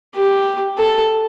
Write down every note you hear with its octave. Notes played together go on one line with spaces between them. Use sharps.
G4
A4